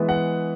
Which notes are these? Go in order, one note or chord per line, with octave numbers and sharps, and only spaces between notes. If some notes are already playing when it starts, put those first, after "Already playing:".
Already playing: E3 G#3 B3
F#5